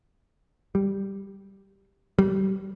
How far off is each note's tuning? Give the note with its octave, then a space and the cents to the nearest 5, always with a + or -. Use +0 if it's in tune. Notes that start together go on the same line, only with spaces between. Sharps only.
G3 +0
G3 -30